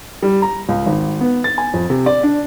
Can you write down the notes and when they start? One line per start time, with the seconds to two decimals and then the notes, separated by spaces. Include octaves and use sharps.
0.22 G3
0.42 A#5
0.69 C#2
0.86 G#1
1.21 B3
1.44 A6
1.58 G#5
1.74 F2
1.90 C3
2.06 D5
2.23 D4